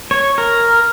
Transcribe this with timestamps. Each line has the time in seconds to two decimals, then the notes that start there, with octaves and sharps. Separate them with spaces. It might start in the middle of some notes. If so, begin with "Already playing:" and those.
0.11 C#5
0.38 A#4